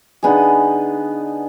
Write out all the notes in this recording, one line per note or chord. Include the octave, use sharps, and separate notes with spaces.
D3 B3 D#4 G#4